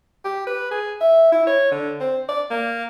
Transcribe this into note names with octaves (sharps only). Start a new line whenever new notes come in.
G4
B4
G#4
E5
E4
C#5
D3
C4
D5
A#3